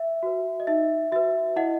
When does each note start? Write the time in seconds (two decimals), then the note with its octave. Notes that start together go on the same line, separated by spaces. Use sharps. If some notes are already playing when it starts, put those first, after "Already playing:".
Already playing: E5
0.23 F#4 B4
0.60 D#5
0.67 D#4 E5
1.12 F#4 B4 E5
1.56 E4 D#5 F#5